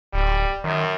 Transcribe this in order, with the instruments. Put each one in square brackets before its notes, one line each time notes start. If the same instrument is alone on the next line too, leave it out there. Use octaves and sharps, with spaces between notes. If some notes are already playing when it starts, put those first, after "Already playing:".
[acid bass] D1 [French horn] G3
[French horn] F#2 [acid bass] D#3